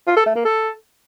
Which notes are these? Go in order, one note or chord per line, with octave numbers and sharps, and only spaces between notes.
F4
A4
A3
A#3
A4